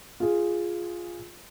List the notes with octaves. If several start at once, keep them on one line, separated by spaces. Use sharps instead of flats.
F4 G#4